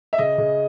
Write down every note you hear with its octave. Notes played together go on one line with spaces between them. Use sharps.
E5
C#3 D#5
C#3